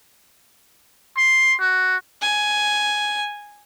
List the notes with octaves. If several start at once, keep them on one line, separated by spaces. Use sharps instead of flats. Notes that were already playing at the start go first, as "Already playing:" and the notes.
C6
F#4
G#5